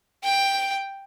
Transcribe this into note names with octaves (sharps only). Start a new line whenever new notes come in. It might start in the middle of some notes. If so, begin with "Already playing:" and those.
G5